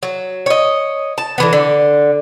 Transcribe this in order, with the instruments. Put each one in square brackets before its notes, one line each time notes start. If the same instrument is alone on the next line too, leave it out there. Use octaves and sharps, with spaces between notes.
[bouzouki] F#3
C#5 D#5
A5
D3 E3 B3
D3